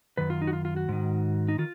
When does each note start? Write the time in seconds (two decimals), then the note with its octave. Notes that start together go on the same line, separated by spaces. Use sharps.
0.17 F#2 D#3 B4
0.30 F4
0.42 D#4
0.47 F#4
0.53 F4
0.65 F4
0.76 F#4
0.89 G#2 D#3
1.48 D#4
1.58 D#3 F4